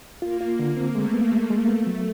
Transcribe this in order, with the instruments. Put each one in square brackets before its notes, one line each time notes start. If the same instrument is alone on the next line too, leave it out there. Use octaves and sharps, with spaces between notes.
[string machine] A#3 [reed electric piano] F4
[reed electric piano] F4
D3
C4
[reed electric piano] G#3 [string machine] A3
[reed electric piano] B3
G#3
G#3
[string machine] A3 [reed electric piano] B3
[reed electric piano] F#3